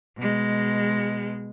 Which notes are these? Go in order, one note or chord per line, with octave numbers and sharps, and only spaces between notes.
B2 G#3